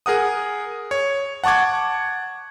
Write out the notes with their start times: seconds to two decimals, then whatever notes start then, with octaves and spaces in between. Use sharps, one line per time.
0.06 G#4 A#4 F#5 D#6
0.91 C#5
1.44 F#5 A5 C#6 D6 G#6